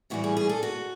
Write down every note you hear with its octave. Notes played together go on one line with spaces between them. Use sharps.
A2 E3 G3 F#4
G#4
G#4
A4
F#4